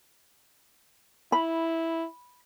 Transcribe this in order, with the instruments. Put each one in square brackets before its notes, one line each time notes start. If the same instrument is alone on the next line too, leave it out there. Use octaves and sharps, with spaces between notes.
[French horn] E4 [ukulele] B5